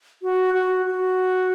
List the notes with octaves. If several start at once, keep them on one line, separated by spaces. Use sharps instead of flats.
F#4
F#4
F#4